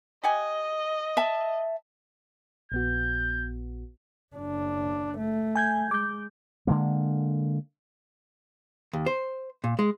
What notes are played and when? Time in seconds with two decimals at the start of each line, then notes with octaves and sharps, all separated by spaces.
0.23 G4 D#5 F#5 G#5
1.17 E5 A5
2.72 A#1 B3 F#4 G6
4.36 F#1 D4
5.18 A3
5.56 G#5 G6 G#6
5.91 G#3 D6 G6
6.67 D3 G#3 A#3
8.93 D#2
9.06 C5
9.64 A#2
9.79 G#3